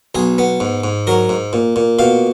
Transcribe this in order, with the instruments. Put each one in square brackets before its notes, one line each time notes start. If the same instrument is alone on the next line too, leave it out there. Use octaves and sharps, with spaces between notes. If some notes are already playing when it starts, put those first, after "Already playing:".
[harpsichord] B1 G#4
B3
G#2
G#2
F#3 A#4
G#2
A#2
A#2
B2 F5